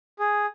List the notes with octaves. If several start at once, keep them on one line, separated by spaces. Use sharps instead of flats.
G#4